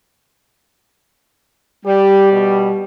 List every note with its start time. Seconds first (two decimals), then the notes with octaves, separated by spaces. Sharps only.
1.86 G3 G4
2.32 B2